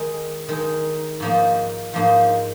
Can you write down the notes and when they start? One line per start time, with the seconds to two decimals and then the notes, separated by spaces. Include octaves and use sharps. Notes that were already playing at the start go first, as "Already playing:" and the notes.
Already playing: D#3 G#3 D#4
0.49 D#3 G#3 D#4
1.20 G#2 F3 A#3 D#4
1.94 G#2 F3 A#3 D#4